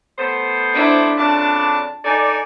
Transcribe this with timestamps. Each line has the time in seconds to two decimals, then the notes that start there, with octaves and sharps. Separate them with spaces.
0.19 A3 B3 C5
0.73 D4 E4
1.19 F2 C#3 D4 A5
2.04 D#4 A4 D5 G#5